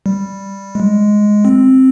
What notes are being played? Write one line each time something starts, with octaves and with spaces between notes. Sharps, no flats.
G3
G#3
C4